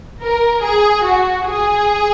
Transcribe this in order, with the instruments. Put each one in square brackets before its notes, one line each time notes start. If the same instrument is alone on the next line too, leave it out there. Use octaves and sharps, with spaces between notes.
[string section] A#4
G#4
F#4
G#4